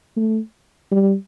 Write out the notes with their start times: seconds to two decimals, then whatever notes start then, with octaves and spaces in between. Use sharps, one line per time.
0.16 A3
0.91 G3